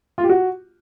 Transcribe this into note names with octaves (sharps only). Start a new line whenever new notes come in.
F4
G4
F#4